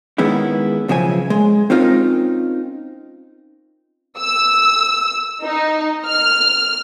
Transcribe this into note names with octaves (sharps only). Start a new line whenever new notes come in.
D#3 G#3 B3 C#4 E4
B1 C#3 F3 E5 G#5
G#3
C4 C#4 D#4 F4 A#4
E6
D#4
F6